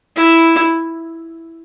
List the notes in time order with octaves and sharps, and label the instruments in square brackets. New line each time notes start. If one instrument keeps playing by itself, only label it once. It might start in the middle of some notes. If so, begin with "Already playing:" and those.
[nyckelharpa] E4